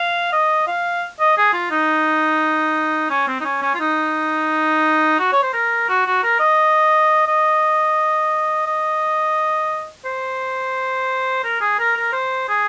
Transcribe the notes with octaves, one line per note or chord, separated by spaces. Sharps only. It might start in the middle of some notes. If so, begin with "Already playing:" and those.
Already playing: F5
D#5
F5
D#5
G#4
F4
D#4
C#4
C4
D#4
C#4
C#4
F4
D#4
F#4
C#5
C5
A#4
F#4
F#4
A#4
D#5
D#5
D#5
C5
A#4
G#4
A#4
A#4
C5
G#4